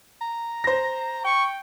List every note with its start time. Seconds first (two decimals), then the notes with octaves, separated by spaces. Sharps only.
0.21 A#5
0.64 C5 A#6
1.25 G5 C#6